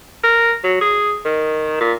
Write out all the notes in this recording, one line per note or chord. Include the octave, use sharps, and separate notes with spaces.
A#4
F#3
G#4
D#3
A#2